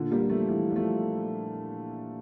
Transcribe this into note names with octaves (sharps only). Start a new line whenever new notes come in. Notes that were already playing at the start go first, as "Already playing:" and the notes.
Already playing: A#2 D3
G3 A#3
F3 A3
E3 G3
G3
F3 A3